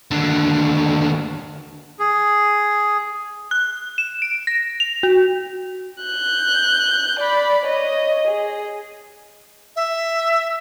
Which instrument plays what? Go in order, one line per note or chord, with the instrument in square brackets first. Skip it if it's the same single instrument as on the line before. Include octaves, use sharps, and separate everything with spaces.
[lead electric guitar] D#2 D3
[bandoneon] G#4
[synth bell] F#6
E7
D7
A#6
F7
F#4
[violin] F#6 G6
D5 B5
C#5 D#5
G#4
[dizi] E5